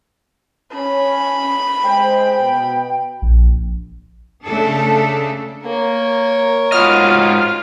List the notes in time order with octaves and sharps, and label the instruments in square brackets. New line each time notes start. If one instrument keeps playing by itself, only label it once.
[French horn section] C#4 [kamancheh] B5
[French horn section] G#3 C5 [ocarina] G5
[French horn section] B2
[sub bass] A#1
[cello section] C#3 A3 D4 A4
[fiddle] A#3 [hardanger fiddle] A#4 C#5
[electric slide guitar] G#2 F#4 D#5 [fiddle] F4 [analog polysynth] F6